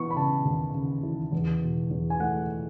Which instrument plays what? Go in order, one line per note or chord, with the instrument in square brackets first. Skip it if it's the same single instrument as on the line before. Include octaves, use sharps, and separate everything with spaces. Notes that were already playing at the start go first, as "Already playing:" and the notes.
Already playing: [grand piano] E3 B3 C#6
B5
C#3 A5
D#2
C#3
E3
E2
B2
E2
G#5
A3 F#5